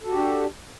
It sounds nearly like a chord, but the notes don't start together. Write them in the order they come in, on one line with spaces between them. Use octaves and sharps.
A4 F#4 G4 D4